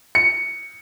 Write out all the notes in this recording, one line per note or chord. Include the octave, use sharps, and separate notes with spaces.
C#7